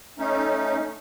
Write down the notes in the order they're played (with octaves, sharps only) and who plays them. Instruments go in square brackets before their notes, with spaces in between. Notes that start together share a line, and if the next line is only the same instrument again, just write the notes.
[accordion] A3 C#4 D#4